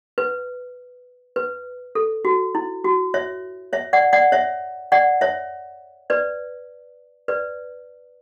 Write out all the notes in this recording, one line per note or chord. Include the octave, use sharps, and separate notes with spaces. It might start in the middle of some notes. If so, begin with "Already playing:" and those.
B4
B4
A4
F#4
E4
F#4
C#5 E5
C#5 E5
D5 F#5
D5 F#5
C#5 E5
D5 F#5
C#5 E5
B4 D5
B4 D5